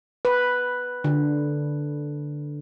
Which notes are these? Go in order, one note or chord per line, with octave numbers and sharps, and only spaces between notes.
B4
D3